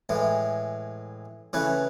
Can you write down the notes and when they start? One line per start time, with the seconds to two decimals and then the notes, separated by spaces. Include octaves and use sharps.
0.09 A2 E3 G#3
1.53 C#3 E3 A3 E4 B4